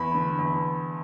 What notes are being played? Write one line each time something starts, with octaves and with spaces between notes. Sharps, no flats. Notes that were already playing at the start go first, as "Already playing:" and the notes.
Already playing: E2 B5
D3
E2